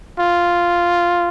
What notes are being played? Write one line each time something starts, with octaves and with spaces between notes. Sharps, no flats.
F4